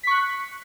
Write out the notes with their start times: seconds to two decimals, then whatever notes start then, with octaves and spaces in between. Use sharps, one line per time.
0.03 B6
0.07 C#6
0.11 F#6